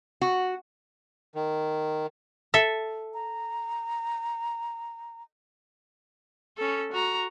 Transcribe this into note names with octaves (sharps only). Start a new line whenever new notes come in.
F#4
D#3
A4 E5
A#5
C#4 A4
F#4 A#5